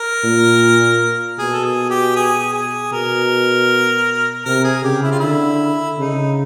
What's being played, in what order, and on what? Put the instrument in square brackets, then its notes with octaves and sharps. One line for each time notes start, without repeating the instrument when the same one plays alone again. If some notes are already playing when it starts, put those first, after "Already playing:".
Already playing: [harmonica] A#4
[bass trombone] A#2
[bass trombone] B2 [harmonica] G#4
[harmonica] A4
G#4
G4
G#4
G#4
[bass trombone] B2 [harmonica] A#4
[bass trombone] C3 [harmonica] A#4
[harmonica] G#4
[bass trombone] C#3 [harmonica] G4
[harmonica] E4
F4
[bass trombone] D3 [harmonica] E4
[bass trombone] C#3 [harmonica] D#4